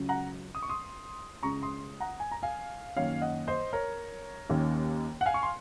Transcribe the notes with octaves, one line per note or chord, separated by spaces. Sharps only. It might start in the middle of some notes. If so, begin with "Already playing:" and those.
Already playing: C#2 C#3 F#3
F#5 A#5
D#6
C#6
C6 D#6
C#2 C#3 G#3 A#5 C#6
C6 D#6
F#5 A#5
G#5
A#5
F5 G#5
F#2 D#3 A#3 C#4 C#5 F5
D#5 F#5
C5 D#5
A#4 C#5
D#2 D#3 A#3 C#4
F#5
F5 G#5
C#6
C6